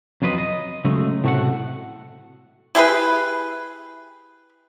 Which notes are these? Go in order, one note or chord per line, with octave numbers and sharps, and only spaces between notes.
F2 F#3 F4 B4 D#5
D#5
C#3 F#3 G#3 A3
A2 C3 A3 D#4 F#4 F#5
E4 G4 G#4 B4